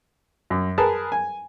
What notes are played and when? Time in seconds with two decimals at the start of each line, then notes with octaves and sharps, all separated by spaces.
0.50 F#2
0.78 G#4 A#4 B4 A5
1.12 G#5